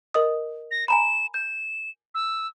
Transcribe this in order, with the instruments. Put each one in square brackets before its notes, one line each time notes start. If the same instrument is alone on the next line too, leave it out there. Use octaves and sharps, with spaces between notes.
[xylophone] A#4 D#5 D#6
[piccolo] A#6
[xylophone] G#5 A#5 B5 [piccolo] E7
[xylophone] G6 [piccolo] E7
[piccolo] E6